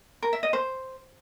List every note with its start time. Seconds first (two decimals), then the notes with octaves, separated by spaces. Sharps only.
0.23 A#4
0.33 E5
0.43 D#5
0.53 C5